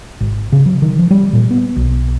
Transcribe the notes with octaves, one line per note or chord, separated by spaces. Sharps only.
G#1
C#3
F#3
D#3
F3
G3
A#2
B3
B1